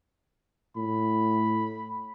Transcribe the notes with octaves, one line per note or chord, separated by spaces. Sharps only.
A2 B5